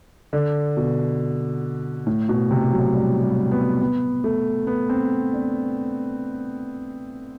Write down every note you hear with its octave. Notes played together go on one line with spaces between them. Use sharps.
D3
B2
A2
B2
C3
F#3
G3
G3
B3
B3
A3
B3
C4
D4